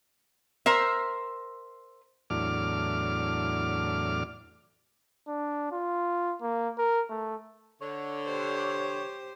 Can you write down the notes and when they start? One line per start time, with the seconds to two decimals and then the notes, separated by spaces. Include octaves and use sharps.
0.66 A#4 C5 E5
2.30 E2 A2 F#3 D4 D6 F6
5.27 D4
5.72 F4
6.42 A#3
6.78 A#4
7.10 A3
7.82 D3 C#5
8.26 G4 C5